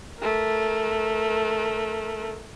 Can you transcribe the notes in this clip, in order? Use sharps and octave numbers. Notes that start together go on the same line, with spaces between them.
A3 A#4